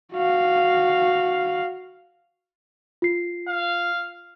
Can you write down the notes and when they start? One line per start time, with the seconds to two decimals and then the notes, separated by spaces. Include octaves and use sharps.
0.13 F#4 F5
3.02 F4 C7
3.48 F5